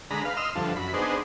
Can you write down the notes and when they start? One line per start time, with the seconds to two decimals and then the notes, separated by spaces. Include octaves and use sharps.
0.11 D3 G#3 A#5 B5
0.25 B4 F5
0.37 D#5 C6 E6 F6
0.55 D2 G2 F3 A4
0.76 F#2 B5
0.94 B3 D4 D#4 G#4 C5